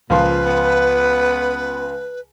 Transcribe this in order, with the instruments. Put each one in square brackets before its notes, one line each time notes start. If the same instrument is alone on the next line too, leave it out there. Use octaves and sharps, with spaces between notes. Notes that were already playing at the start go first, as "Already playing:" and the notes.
[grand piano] C#2 F3 C6 [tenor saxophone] A#2 [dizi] B4
[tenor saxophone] B3